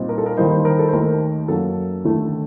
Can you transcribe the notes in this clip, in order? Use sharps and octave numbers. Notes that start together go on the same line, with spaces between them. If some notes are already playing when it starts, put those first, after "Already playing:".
Already playing: A#2 G3 C4 D#4
A#4
A4
A#4
D#2 D#3 G3 A#3 D#4 C5
C5
A#4
A4
C5
D#2 D#3 A3 A#4
F#2 F#3 A#3 A4
D#2 D3 A3